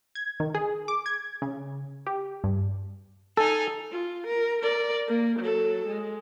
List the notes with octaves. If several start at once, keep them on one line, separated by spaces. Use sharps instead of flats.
G#6
D#3
G#4
D6
G#6
C#3
G4
G2
D#4 A4 G#5
F4
A#4
A#4 D5
A#3
F#3 A4
G#3